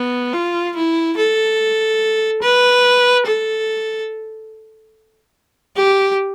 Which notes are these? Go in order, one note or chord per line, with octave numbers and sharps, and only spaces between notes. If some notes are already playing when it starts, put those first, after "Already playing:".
Already playing: B3
F4
E4
A4
B4
A4
G4